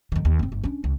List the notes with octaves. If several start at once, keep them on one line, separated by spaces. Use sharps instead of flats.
F2 D#3
D#2
F#1 C4
G1
C#4 D4
C#2